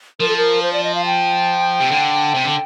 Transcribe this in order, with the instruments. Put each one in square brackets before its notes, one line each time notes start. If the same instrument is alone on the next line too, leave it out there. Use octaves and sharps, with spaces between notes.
[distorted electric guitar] F3 [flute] A#4
[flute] A4
A#4
C5
D5
D#5
F5
G5
[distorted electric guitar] C3
D3
C3
D3